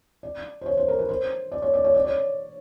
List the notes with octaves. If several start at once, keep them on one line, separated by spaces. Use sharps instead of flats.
D5
C5
C#5
C5
A#4
B4
C5
D5
C#5
D5
C#5
D5
C#5